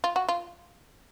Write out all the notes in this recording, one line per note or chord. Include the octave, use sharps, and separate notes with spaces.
F4
F#4
F4